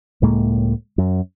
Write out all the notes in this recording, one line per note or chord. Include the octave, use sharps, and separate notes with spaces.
C#2 A2 G#3 A#3
F#2